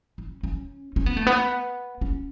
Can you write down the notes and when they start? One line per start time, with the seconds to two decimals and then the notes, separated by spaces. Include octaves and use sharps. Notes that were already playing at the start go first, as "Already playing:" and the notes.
0.18 C#4
0.43 C#4
0.96 C#4
1.06 B3
1.17 A3
1.27 B3
2.01 C#4